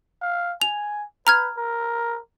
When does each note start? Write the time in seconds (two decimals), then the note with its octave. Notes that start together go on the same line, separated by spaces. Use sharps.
0.22 F5
0.61 G#5 F7
1.27 B4 A#5 F6 G#6
1.57 A#4